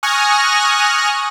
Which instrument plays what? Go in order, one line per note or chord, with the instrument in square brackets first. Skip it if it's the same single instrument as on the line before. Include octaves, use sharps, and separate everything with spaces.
[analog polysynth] G#5 C#6 D#6 F6 F#6 A#6